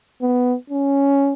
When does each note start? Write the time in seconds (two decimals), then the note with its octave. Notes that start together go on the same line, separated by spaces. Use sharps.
0.21 B3
0.70 C#4